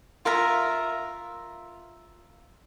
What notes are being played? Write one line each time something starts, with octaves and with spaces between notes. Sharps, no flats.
F4 A#4 E5 A#5